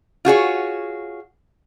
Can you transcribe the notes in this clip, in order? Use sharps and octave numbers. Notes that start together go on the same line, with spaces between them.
F4 F#4 G#4 C#5